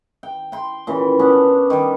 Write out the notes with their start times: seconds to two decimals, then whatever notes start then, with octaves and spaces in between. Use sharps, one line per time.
0.23 G5
0.52 G5 C6
0.87 A#2 C#3 E3
1.19 B3 C#4 D4
1.70 D#3 G3